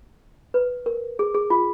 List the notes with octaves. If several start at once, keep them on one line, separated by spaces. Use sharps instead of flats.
B4
A#4
G#4
G#4
F4